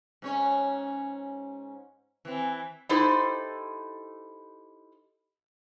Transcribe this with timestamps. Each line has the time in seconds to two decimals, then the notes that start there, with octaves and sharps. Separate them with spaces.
0.22 G#2 C#4 C#5
2.25 E3 C4
2.89 D#4 E4 G4 A4 C5